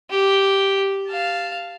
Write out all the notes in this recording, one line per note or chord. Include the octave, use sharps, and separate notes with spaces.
G4
F5 A5